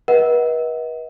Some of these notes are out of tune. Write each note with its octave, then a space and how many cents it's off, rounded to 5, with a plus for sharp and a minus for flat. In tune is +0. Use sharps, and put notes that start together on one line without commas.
B4 -40 D#5 +40 F#5 +0